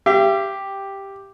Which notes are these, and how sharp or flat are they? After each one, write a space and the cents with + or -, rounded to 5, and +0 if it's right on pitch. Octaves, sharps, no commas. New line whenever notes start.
G4 +0 E5 +45